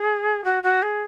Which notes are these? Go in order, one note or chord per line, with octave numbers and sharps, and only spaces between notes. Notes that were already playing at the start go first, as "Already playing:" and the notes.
Already playing: G#4
F#4
F#4
G#4